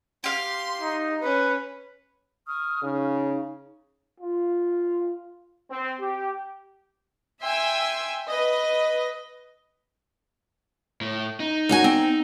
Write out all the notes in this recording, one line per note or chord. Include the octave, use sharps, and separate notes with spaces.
G4 F5 C6
D#4
C#4 B4
C#6 D#6 F6
C#3 D#4
F4
C4
G4
E5 G5 G#5 C6 E6
B4 D#5
A2
D#4
F#2 F#4 G#5
C4